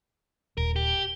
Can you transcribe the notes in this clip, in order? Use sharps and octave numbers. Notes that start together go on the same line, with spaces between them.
D#1 A#4
G4